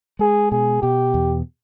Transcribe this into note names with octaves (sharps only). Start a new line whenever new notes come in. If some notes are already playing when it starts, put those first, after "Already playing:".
G#3 G#4
B2 G#4
B2 G4
E2